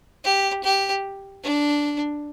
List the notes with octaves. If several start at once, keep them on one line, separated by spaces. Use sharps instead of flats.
G4
G4
D4